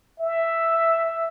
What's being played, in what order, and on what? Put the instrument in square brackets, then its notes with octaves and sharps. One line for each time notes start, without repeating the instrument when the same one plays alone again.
[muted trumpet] E5